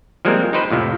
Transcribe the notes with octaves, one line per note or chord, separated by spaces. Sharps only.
F3 G3 G#3 A#3 C4 A#4
D#4 G4 B4 C5
F2 A2 C3 F3